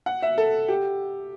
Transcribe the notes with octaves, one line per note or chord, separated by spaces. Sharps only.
F#5
E5
A4
G4